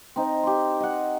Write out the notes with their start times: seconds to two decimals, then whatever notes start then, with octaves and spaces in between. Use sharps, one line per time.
0.16 C4 D#4
0.43 G4 C6
0.80 D#5 F#5